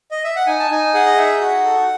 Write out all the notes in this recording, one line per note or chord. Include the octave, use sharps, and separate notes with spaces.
D#5
E5
F#5
D#4 G#5
A5
D#4 G#5
G#4 F#5
D#5
D#4 E5
F#4 F#5
A4